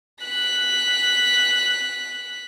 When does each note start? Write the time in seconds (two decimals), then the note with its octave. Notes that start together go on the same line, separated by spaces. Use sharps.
0.24 F#6 B6